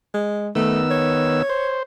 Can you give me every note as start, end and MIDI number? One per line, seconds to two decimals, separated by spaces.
0.14 0.50 56
0.55 1.42 51
0.55 0.81 57
0.55 1.42 59
0.55 1.42 88
0.91 1.78 73
1.49 1.83 72